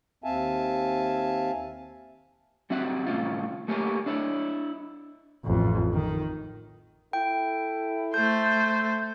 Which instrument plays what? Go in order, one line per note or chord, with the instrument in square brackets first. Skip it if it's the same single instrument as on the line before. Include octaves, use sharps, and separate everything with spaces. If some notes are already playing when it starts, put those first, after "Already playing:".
[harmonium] D#2 C4 E5 F5 G#5 A5
[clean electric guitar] G3 C4 F#4 E5 F#5
C2 A2 D#3 C#4 F4
A3 A#3 G4 A#4 C#5 G#5
D4 E4 C#5
[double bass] A1 F2
D#3
[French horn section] E4 A4 [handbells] G5
[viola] A3 C5 [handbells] G6
[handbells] G6